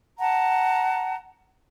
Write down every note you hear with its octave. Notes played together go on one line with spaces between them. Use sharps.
F#5 A5 A#5